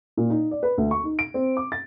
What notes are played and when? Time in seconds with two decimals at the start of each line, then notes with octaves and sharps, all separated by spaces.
0.17 A#2
0.30 D#4
0.51 D5
0.63 B4
0.78 D2
0.91 C#6
1.04 D#4
1.19 D7
1.34 C4
1.57 D6
1.72 A6